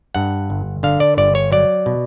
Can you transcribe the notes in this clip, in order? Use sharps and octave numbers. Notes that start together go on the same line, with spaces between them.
G2 F#5
G1
D3 F5
D5
G1 D5
C#5
F#3 D5
B2